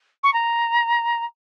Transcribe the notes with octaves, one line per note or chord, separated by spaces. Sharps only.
C#6
A#5